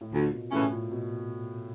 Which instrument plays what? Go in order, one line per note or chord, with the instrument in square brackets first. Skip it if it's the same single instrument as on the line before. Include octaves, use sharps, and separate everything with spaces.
[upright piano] A2
[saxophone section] D2 [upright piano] A#2
[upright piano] B2
[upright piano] A2 [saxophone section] C#3 E3 A3 C#4
[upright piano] A#2
B2